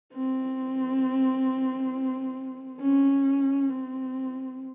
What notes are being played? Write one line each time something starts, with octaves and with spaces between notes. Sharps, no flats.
C4
C#4
C4